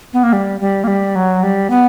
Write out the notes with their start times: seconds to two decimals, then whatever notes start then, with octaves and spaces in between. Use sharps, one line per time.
0.13 B3
0.23 A#3
0.33 G3
0.60 G3
0.84 A#3
0.88 G3
1.16 F#3
1.43 G3
1.70 B3